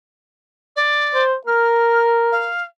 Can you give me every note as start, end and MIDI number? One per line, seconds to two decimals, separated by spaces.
0.76 1.24 74
1.14 1.35 72
1.47 2.50 70
1.47 2.11 89
2.32 2.63 77